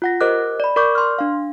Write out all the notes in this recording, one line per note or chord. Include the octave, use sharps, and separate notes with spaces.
F4 F#5 A#6
G4 A#4 C5 D#5 D6 F#6
D5 B5
A#4 D5 C#6 D6 G6
C6 F6
D4 F5